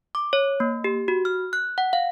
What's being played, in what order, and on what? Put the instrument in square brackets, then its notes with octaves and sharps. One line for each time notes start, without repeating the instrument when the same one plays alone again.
[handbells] D6
C#5
A#3
G4
F#4
F6
F#6
F#5
F5